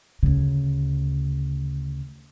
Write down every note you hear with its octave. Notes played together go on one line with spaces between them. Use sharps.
D2 C#3